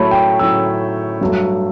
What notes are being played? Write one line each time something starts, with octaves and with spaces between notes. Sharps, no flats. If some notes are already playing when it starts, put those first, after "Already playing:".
Already playing: A2 F#3 A3 C#5 B5
G5
A2 F#3 A3 E6
G2 F#3 A3